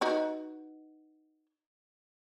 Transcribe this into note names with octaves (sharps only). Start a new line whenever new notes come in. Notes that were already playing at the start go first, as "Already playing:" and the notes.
D#4 F#4 B4